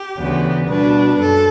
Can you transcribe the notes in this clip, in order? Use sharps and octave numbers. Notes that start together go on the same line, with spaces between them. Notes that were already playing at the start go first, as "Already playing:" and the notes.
Already playing: G4
D2 C#3 E3 B3
B2 G3 D4 B4
F#2 A4